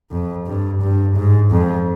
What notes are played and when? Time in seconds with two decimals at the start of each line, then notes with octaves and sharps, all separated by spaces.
0.11 F2
0.47 G2
0.82 G2
1.16 G#2
1.51 F2